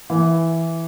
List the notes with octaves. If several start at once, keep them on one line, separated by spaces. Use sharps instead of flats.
E3